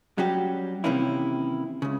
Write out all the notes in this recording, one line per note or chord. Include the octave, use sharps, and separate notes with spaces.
F#3 G3 C#4 F#4 G4
C3 D#3 E3 A#3 C#4 E4
C#2 C#3